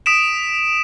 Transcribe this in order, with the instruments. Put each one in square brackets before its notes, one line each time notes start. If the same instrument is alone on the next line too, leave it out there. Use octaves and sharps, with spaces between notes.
[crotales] D#6 B6 D7 E7